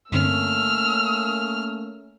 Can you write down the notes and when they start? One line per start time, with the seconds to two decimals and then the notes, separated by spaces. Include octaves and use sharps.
0.12 G2 D3 A3 A#3 C4 C#4 E6 F6